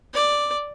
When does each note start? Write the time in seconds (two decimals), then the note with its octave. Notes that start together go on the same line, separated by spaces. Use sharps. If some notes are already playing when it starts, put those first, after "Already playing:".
0.14 D5